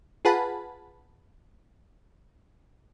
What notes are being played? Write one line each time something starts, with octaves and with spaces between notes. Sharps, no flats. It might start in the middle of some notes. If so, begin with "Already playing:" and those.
F4 G#4 B4 F#5 A5 B5